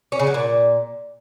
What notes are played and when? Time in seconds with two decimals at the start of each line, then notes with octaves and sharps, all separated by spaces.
0.12 C#4
0.19 C#3
0.27 F#3
0.34 A#2